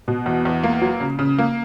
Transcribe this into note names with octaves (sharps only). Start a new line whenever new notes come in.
B2
E2
E2
A#3
F#3
C#3
C#3
A#3